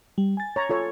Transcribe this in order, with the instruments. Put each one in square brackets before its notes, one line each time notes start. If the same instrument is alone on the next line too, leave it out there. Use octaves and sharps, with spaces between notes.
[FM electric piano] G3
G#5 A6
[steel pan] C#5 A#5
F4 A4 C#5